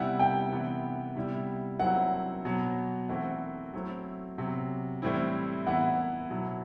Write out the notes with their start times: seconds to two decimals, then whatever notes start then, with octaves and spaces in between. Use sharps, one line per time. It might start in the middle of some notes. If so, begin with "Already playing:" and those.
Already playing: C3 G3 B3 E4 F#5
0.19 G5
0.52 C3 E3 B3
1.16 C3 G3 B3 E4
1.79 F#3 C4 E4 F#5
2.45 B2 F#3 B3
3.09 E3 A3 C4 F#5
3.74 F#3 A3 C4 E4
4.38 C3 F#3 B3
5.02 A2 E3 G3 C4 E4
5.67 E3 B3 E4 F#5
6.30 B2 F#3 B3 E4